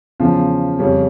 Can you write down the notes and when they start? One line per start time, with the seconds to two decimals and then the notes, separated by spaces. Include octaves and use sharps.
0.20 E2 C#3 F3
0.79 F2 C#3 G3 C#4